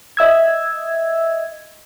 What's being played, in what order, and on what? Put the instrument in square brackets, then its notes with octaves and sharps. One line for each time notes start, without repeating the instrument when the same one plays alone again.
[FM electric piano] D#5 E5 E6 G#6